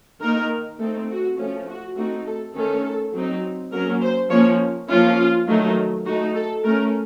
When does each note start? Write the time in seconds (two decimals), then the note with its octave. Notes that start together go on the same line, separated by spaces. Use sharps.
0.21 D#3 A#3 D#4 A#4
0.80 A3 C4 D#4 A4
1.09 F#4
1.38 F3 A3 C#4
1.68 F#4
1.97 A3 C4 D#4 F#4
2.25 A4
2.55 D#3 A3 C#4 A4
3.13 F#3 C4 D#4
3.72 F#3 A#3 C#4 A#4
4.01 C5
4.30 F3 A#3 C#4 C#5
4.89 F3 A#3 C#4 F4
5.47 D#3 F#3 A3 D#4
6.06 A3 D#4 F#4
6.35 A4
6.64 A3 C#4 A#4